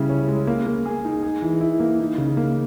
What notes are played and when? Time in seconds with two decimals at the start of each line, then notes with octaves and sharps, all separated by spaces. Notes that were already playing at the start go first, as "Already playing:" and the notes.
Already playing: C#3 G3 E4
0.09 C#4
0.28 G#3
0.47 A#3
0.66 A#3
0.86 G#4
1.05 D#4
1.23 G#4
1.42 E3
1.61 E4
1.80 A#3
2.00 D#4
2.18 C#3
2.37 A#3